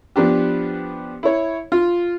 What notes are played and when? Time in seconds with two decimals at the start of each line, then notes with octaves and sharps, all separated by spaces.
0.16 F3 B3 D4 G4
1.23 E4 C#5
1.72 F4